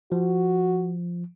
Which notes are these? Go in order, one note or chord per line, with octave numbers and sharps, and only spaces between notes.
F3 F#4